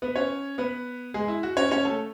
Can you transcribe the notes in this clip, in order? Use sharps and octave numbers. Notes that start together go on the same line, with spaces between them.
B3 B4
C#4 C#5
B3 B4
G#3 G#4
E4
F#4
C#4 C#5
C#4 C#5
A3 A4